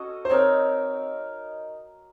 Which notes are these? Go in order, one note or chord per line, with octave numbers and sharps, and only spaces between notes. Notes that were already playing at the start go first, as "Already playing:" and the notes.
Already playing: C#4 F#4 A4 D#5
C5
C4 D#4 A#4 C#5